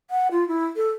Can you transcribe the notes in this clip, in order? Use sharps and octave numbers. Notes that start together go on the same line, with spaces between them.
F#5
F4
E4
A4